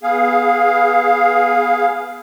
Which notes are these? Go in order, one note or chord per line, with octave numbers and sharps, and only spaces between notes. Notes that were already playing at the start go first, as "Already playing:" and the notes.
B3 G#4 F5